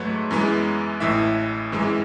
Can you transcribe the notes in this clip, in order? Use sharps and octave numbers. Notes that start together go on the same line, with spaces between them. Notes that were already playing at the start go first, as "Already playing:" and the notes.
Already playing: G#2 F#3 A3 B4 C#5
F#2 E3 G#3 B3
A1 A2 E3 E5
G#1 F#2 E3 G#3